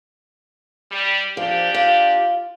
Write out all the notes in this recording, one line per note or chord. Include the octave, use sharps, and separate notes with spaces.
G3
A#2 F3 D4 G4
F4